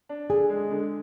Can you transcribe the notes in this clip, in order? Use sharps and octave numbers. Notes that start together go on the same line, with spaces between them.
D4
D3 G#4
G#3
D3